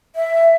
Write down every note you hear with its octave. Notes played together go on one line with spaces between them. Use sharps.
E5